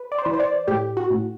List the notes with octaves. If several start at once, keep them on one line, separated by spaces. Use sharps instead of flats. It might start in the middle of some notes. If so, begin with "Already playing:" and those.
Already playing: B4
D5
C5
E3 B4
C5
D5
A2 G4
F#4
A2